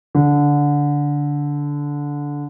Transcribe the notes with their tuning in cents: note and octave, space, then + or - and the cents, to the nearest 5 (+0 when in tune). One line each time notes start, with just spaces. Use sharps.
D3 -15